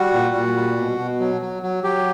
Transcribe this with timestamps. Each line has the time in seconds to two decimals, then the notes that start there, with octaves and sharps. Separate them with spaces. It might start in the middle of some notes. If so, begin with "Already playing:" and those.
Already playing: G3 F#4
0.13 A#2
0.35 A#2
0.56 G3
0.78 B2
0.99 B2
1.20 F#3
1.41 F#3
1.63 F#3
1.84 F#3 G4